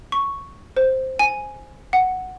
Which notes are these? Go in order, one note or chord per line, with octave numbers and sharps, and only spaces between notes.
C#6
C5
G#5
F#5